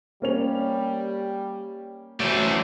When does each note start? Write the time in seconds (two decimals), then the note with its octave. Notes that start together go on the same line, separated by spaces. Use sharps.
0.22 G3 A#3 C#4 F7
2.20 E3 F#3 A3 C5 D5